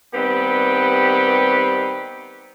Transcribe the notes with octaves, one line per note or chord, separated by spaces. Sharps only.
D#3 G3 B3 C4 G4 B4